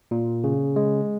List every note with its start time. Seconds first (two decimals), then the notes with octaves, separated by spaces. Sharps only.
0.11 A#2
0.44 C#3
0.76 G#3